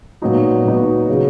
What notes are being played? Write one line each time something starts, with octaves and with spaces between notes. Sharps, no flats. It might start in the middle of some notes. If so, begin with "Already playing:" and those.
A#2 F#3 B3 D#4 F#4
A#2 F#3 B3 D#4 F#4
C#3 F#3